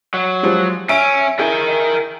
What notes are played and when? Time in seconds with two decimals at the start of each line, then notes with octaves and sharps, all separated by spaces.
0.14 F#3
0.43 F3 G3 G#3
0.89 C#4 E5 D7
1.39 E4 G#4 A#4 G5